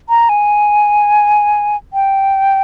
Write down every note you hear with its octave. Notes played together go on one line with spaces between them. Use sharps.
A#5
G#5
G5